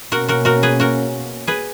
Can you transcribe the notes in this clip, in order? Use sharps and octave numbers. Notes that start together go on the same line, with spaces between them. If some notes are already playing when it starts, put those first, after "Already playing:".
B2 A#3 C#4 F#4 A#4
F#4 A#4
F#4 A#4
G#4 B4
F#4 A#4
G#4 B4